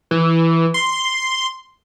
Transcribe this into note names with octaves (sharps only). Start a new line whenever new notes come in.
E3
C6